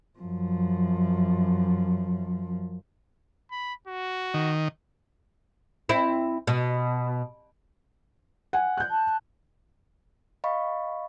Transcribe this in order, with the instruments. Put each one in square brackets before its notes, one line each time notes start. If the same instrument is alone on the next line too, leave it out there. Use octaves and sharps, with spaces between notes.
[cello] F#2 F3
[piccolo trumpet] B5
F#4
[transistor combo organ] D#3
[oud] C4 E4
B2
[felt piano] F#5 G#5
F#6 G6
[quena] A5
[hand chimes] D#5 F5 B5 C#6